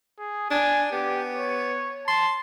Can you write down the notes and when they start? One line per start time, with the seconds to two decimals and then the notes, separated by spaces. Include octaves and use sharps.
0.19 G#4
0.51 D4 G#5
0.92 B3 G4
1.35 C#5
2.08 A5 C6